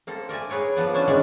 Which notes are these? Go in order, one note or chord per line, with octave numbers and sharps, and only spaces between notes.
A#3 C4 A4
A#4 D5 E5 G#5
G#4 B4 C#5 G5
F3 B3 D5 G#5
C#4 D4 G#5 A5
D#3 G#3 B3 C#4 D4 D5